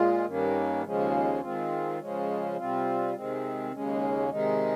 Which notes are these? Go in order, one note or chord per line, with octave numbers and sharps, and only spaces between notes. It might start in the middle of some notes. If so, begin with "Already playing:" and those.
Already playing: A#2 G#3 F4
G2 D#3 A#3 C#4
D#2 C#3 F3 G#3 C#4
D#3 G#3 C4 F4
C#3 F3 G#3 C#4
C3 G3 C4 F4
C3 D#3 G#3 C4
D#2 C#3 G#3 C#4
C3 D#3 G#3 D#4